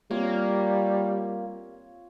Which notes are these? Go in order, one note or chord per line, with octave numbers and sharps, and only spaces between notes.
G3 A#3 C4 F4 C#5